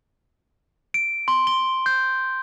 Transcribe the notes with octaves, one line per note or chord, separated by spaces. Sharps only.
D7
C6
G7
G6